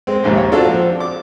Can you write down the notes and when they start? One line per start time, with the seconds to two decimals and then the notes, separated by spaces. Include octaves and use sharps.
0.07 G#3 C4
0.24 A#1 D#2 G#2 C3
0.37 C#5
0.52 C4 D4 F4 F#4 A4
0.68 F3
1.00 D6